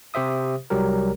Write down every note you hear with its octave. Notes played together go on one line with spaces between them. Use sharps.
C3 G4 C5 E5 D#6
C2 F#3 G3 G4 A#4